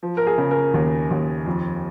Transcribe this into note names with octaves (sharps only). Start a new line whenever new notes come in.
F3
A#4
G#4
C#3
A#4
D#2
D#2
F2